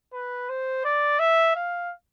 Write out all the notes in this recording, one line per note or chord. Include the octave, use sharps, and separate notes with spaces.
B4
C5
D5
E5
F5